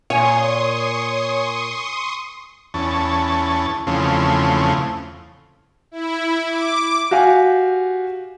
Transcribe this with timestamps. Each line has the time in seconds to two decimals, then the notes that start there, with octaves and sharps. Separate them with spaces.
0.10 A#2 C#5 G#5 C6 C#6 D#6
2.74 E2 C#4 A5
3.87 E2 C#3 F3 A3 C4
5.91 E4
6.48 D6
7.11 F#4 G4 F5 G#5